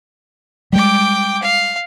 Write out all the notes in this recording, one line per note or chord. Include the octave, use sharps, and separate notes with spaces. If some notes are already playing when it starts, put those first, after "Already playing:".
G3 G#3 G5 D6
F5